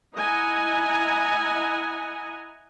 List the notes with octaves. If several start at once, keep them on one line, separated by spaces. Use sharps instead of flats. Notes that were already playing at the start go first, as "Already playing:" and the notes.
E4 D#5 F#5 G#5 A#5